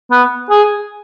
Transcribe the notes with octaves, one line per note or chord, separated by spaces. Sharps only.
B3
G#4